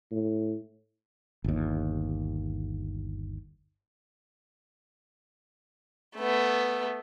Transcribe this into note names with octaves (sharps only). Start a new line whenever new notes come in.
A2
G1 D#2
A3 B3